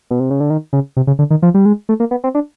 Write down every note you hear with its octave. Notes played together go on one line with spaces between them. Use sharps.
B2
C3
C#3
D3
D#3
C#3
C3
C#3
D3
D#3
F3
G3
G#3
A3
A#3
B3
C4
D4